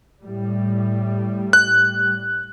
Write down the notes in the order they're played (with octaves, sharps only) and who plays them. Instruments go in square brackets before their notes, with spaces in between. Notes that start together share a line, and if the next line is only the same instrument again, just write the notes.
[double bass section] A2 G3
[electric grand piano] F#6